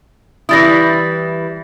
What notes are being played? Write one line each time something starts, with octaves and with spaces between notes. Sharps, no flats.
E3 G3 E4 D#6 A6 A#6